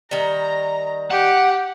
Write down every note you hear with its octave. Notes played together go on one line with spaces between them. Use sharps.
D#3 G3 A#5
G4 F#5